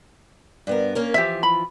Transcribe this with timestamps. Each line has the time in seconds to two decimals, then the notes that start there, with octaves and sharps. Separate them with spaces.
0.67 G2 B3 A#4
0.95 A#3 C#4 A#4
1.14 E3 F3 G4 E5
1.43 B5